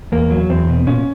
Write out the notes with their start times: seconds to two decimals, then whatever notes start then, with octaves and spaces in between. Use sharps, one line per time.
0.12 E2 A#3
0.30 F#3
0.49 E2 C4
0.69 B2
0.87 A#2 C#4